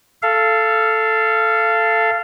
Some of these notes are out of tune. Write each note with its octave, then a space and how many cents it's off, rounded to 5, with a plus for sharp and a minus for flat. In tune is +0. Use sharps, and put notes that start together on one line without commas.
A4 +0 F5 -20